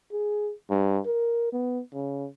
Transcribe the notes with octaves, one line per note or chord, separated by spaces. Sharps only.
G#4
G2
A#4
B3
C#3